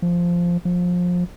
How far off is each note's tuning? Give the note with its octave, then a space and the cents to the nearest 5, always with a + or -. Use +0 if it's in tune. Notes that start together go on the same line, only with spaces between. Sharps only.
F3 -5
F3 +25